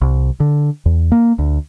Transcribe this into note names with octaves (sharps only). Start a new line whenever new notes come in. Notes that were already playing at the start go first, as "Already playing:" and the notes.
C2
D3
E2
A#3
D2